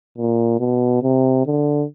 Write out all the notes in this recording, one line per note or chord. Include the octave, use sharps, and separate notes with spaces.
A#2
B2
C3
D3